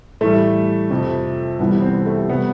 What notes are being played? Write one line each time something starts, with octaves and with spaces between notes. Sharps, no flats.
A2 E3 G3 A3
F2 C3 F3
C2 C3 E3 G3 B3
C4
A3
C3 G3 B3